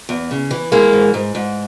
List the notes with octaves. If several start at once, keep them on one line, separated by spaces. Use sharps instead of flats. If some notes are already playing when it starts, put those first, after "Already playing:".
E2
C#3
E3
E3 G#3 A#3
G#2
G#2
G#2